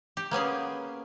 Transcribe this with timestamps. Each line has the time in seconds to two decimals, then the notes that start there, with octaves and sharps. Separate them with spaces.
0.17 G4
0.31 A#3 B3 C#4 G#4